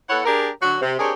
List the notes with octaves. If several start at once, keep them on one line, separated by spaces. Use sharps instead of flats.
B3 E4 A4 C#5 F#5
D4 G4 G#4 A#4
D3 F#3 F#4
C3
C4 D4 G4 G#4 A#4 C#5